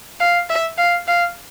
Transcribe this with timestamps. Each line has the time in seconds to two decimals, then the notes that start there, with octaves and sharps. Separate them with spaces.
0.20 F5
0.50 E5
0.78 F5
1.08 F5